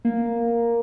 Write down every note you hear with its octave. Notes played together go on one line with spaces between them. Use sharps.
A#3